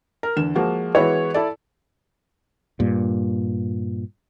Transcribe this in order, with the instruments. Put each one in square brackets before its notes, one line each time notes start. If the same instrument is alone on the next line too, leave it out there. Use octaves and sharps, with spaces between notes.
[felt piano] A#4
E2 D3 E7
F3 G#3 A#3 F#4
E3 G#3 B3 E4 F#4 C#5
E4 A4 D5
[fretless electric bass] G2 A#2